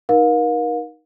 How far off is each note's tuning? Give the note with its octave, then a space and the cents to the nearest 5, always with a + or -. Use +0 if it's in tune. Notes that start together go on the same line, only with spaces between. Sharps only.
D#4 +0 A#4 +35 F5 +35